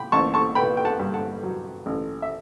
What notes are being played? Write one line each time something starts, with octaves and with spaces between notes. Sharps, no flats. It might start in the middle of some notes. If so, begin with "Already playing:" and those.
Already playing: G5 B5
A1 A5 C#6
A5 C#6
B3 G5 B5
G5
F#5 A5
G2
F#5 A5
F#3
A1
E5